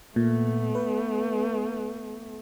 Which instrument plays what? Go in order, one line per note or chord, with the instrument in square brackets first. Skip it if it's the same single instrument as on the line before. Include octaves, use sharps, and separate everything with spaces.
[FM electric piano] A#2 [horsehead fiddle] A3 B3
[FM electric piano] B4